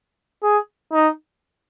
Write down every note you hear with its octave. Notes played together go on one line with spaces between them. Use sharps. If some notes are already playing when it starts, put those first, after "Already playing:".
G#4
D#4